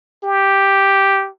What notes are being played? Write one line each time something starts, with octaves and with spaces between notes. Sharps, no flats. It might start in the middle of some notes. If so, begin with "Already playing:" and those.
G4